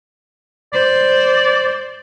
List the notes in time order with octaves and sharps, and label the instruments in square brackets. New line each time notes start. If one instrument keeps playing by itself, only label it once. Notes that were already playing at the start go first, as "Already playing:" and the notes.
[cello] C5 [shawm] D5